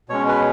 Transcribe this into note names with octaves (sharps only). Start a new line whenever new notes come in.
B2 G#3 C#4 C#5
B4